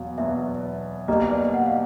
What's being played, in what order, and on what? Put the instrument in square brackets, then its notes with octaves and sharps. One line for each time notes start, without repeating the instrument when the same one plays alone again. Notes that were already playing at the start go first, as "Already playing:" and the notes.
Already playing: [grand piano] E2 B2 F#3 [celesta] F5
[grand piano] E2 B2 F#3 [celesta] E5
[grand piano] B1 B2 G3 A#3 [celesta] D#5
[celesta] D5
F#5
F5